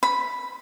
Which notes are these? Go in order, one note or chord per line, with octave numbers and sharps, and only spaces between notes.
B5